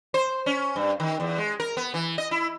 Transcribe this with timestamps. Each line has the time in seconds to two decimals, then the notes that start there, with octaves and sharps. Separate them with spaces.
0.14 C5
0.46 C#4
0.76 G2
1.00 D#3
1.20 E2
1.38 G#3
1.60 A#4
1.77 B3
1.94 E3
2.18 D#5
2.31 E4